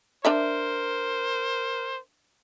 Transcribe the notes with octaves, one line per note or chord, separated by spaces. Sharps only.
D4 A#4 C5 D5 E5